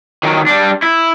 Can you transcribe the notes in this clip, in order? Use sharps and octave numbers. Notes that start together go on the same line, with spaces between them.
D#3 F#3
G3 D4
E4